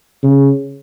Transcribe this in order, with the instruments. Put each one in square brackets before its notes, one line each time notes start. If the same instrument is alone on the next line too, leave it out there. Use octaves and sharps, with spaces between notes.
[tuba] C#3